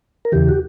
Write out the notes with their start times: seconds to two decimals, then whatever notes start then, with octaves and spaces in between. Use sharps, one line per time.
0.25 A#4
0.32 E2 C#3 E3 G4
0.49 F#4